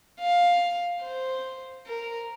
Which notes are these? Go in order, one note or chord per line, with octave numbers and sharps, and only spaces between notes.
F5
C5
A#4